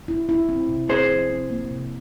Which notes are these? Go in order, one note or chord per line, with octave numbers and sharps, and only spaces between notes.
E4
E4
C4
C3
C4 G#4 C5
F3
C4
A#3
C3